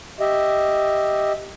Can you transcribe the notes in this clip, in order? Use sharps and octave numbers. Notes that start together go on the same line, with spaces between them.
G4 D#5 E5